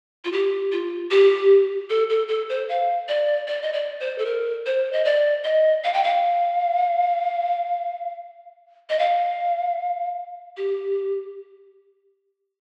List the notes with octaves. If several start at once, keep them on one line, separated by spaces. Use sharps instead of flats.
F4
G4
F4
G4
A4
A4
A4
C5
F5
D5
D5
D#5
D5
C5
A4
A#4
C5
D#5
D5
D#5
F5
G5
F5
D#5
F5
G4